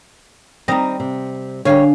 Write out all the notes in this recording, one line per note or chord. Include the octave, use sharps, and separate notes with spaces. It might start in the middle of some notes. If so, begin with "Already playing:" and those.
G3 C4 D#4 D#5 A#5
C3
D3 G3 C#5 F5 G#5